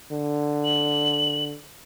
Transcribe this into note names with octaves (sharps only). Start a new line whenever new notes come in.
D3
F#7